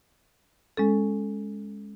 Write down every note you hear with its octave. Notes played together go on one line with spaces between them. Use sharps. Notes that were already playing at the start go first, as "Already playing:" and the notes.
G#3 C#4 A4